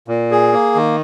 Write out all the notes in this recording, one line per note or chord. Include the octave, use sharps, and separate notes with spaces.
A#2
G#4
A#3
D#3